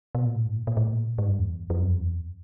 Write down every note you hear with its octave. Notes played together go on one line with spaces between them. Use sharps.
B2
A#2
A2
G#2
A#2
A#2
A2
A#2
G#2
G2
E2
F2
F#2
F2
E2
F2